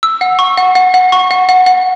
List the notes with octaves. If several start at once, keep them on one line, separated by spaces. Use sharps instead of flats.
E6
F#5
C#6
F#5
F#5
F#5
C#6
F#5
F#5
F#5